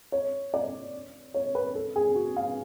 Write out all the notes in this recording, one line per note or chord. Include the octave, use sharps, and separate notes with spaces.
C#5
D5
C#5
B4
A4
G#4
F#4
F5